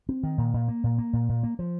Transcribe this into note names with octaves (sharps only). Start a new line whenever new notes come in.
C4
D#3
A#2
A#2
A#3
A#2
A#3
A#2
A#2
A#3
F3